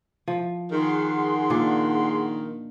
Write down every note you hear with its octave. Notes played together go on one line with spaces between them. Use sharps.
F3
D#3 G#4 F#5 C6
A#2 D4